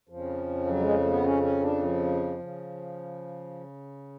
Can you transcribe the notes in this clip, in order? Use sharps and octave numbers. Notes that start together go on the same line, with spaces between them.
F2 C#3 F3
F#3
G#3
A3
B3
C#4
C#4
D4
F3
C#3